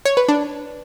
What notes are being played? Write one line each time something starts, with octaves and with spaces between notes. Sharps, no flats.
C#5
B4
D4